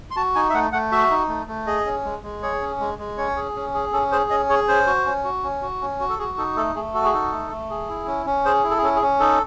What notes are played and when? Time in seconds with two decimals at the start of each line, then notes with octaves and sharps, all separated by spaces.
0.11 C6
0.16 F#4 A5
0.35 D#4 G#5
0.50 E5
0.54 A3 F#5
0.72 A3 F#5
0.92 F#4 E5
1.10 D#4
1.29 A3
1.47 A3
1.66 G#4 D#5
1.86 C#4
2.04 G#3
2.23 G#3
2.42 G#4 C#5
2.61 C#4
2.80 G#3
2.98 G#3
3.18 C#4 C#5
3.36 G#4
3.55 C#4
3.74 G#4
3.93 C#4 A4
4.12 G#4 C5
4.30 C#4 D#5
4.49 G#4 C#5
4.68 C#4 C5
4.87 F#4
5.06 C#4
5.24 F#4
5.43 C#4
5.62 F#4
5.81 C#4
6.00 F#4
6.09 A4
6.19 F#4 G#4
6.38 D#4 A4
6.56 A3 A4
6.75 A3 G#4
6.94 F#4 A4
7.04 G#4
7.13 D#4 A4
7.32 A3
7.51 A3
7.70 G#4
7.89 E4
8.07 C#4
8.26 C#4
8.45 G#4 C5
8.64 E4
8.70 A4
8.78 G#4
8.82 C#4 A4
8.95 G#4
9.02 C#4
9.20 D#4 A4